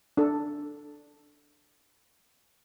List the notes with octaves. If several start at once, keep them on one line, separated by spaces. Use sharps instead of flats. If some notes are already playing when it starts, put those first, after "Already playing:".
D4 A4